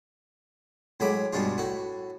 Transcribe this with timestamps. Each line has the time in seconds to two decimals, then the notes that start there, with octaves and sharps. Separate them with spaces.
1.00 A2 F#3 G#3 B5 D6
1.33 G2 B2 G#3 D4 F4
1.58 A2 F#4